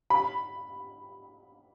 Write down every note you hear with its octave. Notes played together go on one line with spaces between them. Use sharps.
B5